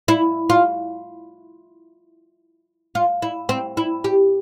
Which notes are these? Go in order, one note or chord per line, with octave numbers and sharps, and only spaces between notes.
E4
F4
F4
E4
C4
E4
G4